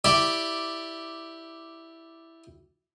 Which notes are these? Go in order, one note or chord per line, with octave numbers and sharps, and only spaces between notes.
E4 G4 D5